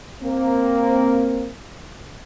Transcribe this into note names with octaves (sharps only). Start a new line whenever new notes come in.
A#3 C4